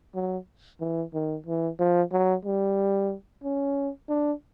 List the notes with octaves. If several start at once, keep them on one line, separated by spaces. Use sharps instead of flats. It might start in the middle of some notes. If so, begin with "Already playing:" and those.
F#3
E3
D#3
E3
F3
F#3
G3
C#4
D4